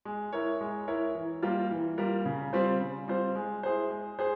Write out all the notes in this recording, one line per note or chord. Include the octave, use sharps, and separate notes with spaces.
G#3
E4 A#4 C#5
G#3
E4 A#4 C#5
E3
G3 A#3 F4 A#4
E3
G3 A#3 F4 A#4
C#3
G3 C4 F4 C5
C#3
G3 C4 F4 C5
G#3
E4 G#4 C5
G#3
G#4 C5